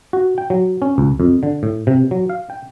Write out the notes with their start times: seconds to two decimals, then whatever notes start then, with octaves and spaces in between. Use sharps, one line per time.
0.13 F#4
0.38 G5
0.50 F#3
0.82 C#4
0.98 C#2
1.20 F2
1.43 D3
1.63 A2
1.87 C3
2.11 F#3
2.30 F5
2.50 G5